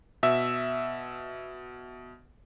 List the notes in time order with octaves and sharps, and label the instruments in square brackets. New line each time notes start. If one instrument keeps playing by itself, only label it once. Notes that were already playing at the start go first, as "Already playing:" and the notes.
[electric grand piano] B2 E5 E6